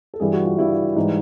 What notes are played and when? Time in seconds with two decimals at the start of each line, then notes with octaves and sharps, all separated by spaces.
0.14 A4
0.20 G2 E3 G3 G#4
0.33 F#4
0.46 F4
0.58 G2 E3 G3 E4
0.96 G#2 E3 G3 D#4